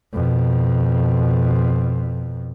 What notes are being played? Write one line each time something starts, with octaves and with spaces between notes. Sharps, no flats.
F2 B2